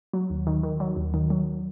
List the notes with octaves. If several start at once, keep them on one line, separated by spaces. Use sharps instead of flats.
F#3
D#2
D#3
D#3
F#3
D#2
D#3
F#3